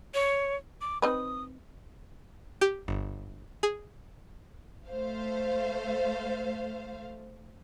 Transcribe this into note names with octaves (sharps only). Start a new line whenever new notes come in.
C#5
D6
C4 D#4 B4 D#6
G4
G1
G#4
A3 C5 F5